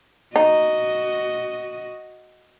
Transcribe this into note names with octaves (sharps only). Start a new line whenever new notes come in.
D#4 F#4 D#5